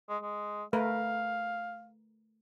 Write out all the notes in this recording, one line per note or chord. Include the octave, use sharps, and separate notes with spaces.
G#3
G#3
A3 A#4 B4 F5